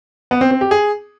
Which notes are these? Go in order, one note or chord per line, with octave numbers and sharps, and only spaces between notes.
B3
C4
C4
G4
G#4